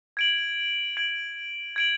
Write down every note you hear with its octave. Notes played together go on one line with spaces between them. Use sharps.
G#6 D7 F#7
G#6 D7 F#7
G#6 D7 F#7